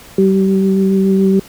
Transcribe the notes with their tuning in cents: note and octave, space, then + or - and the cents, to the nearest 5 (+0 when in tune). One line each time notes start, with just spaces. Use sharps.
G3 -30